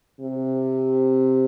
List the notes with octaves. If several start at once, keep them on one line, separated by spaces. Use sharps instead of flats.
C3